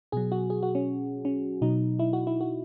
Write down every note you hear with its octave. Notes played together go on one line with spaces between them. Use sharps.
B2 F#3 G#4
F#4
G#4
F#4
C#4
C#4
B2 F#3 D#4
E4
F#4
E4
F#4